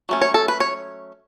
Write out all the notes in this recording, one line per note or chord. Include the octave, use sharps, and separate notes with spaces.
F#3 A3 C#4
C#5
A4
B4
C#5